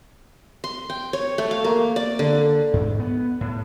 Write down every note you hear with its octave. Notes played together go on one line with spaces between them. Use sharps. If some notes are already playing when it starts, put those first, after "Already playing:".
C6
G5
C#5
A3
F5
A#3
D5
D3
G#2
B3
A2